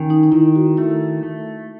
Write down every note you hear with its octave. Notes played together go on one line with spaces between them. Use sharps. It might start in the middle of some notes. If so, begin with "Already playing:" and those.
Already playing: D#3 C#4
D#4
D#4
D#3 E4
F#4
A3 E4
A3